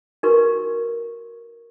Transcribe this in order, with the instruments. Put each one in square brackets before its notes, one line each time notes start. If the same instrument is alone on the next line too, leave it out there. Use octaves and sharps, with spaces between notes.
[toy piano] D#4 F#4 A#4 B4 C#6